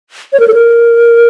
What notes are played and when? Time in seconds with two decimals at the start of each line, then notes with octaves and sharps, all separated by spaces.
0.33 C#5
0.40 A#4
0.48 A4
0.54 A#4